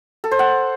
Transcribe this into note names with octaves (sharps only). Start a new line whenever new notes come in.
A4
C5
F#5